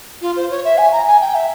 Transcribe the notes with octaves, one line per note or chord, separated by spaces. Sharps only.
F4
C5
C#5
E5
G#5
A#5
G#5
G5
E5